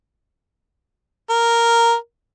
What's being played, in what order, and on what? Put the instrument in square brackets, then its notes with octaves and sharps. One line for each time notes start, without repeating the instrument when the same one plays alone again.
[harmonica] A#4